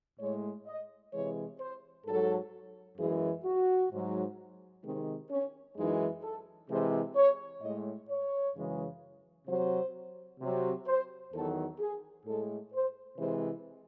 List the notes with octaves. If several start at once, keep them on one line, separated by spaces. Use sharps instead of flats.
A2 G#3 C#5
D#5
C3 E3 G#3 C#5
C5
G#2 F#3 A4
F#2 E3 G#3 G#4
F#4
G#2 F#3
C3 D#3 G#3 C4
C#4
F#2 E3 G#3 D#4
A4
C3 E3 G#3 C5
C#5
A2 G#3 D#5
C#5
F#2 C#3 E3 G#3
C3 F#3 C5
C3 F#3
C5
E2 D#3 F#3 A4
G#4
A2 G#3 A4
C5
C3 E3 G#3 C5